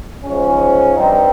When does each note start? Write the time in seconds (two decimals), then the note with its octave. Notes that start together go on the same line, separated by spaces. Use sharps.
0.24 G#2 F3 G#3 C#4
0.96 G2 G3 C4 D#4